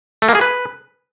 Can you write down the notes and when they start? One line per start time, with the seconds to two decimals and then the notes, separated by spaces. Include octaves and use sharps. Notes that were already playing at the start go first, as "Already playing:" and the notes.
0.22 A3
0.29 A#3
0.35 G#4
0.41 B4